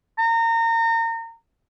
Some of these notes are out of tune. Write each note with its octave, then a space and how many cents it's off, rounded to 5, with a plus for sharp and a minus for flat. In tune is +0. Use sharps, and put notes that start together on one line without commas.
A#5 -30